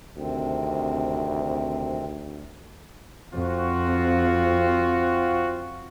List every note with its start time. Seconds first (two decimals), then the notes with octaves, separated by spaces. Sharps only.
0.17 D2 C3 D#3 C4
3.34 F2 C4 F4 F#4